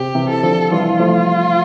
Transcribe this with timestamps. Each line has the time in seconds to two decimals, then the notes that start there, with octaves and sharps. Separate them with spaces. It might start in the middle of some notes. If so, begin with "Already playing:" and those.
Already playing: C3 G4
0.15 C3 E3
0.30 A4
0.43 D3 F3
0.72 E3 G3 F4
1.00 F3 A3